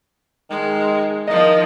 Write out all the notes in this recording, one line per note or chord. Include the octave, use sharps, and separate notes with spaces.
D#3 G#3
D#3 F3 D#5